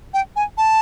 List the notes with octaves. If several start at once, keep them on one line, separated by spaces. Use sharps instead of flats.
G5
G#5
A5